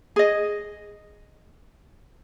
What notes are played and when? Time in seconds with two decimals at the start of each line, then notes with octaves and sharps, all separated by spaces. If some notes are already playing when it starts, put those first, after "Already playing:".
0.16 G#4 D#5